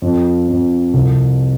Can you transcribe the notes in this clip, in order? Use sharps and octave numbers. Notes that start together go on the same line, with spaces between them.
F2
F2
C2